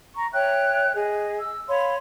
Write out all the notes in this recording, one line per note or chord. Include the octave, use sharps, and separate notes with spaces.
A#5 C#6
C#5 E5 G5 F#6
G#4 D#5
E6
C#5 F5 B5 C6